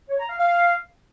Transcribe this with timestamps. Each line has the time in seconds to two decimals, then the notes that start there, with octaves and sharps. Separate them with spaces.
0.09 C#5
0.19 A#5
0.30 F5
0.40 F5